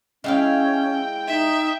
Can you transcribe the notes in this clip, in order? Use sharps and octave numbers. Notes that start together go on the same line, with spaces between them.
G#3 C#4 E4 F5 G5
D#4 E5